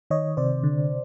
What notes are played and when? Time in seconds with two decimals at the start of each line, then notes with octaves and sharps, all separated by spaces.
0.11 D#3 C#5 D#5
0.37 C3 C5 D5
0.64 D3